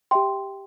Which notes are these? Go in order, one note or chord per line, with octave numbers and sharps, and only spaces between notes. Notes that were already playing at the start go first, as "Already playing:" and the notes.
G4 E5 G5 C6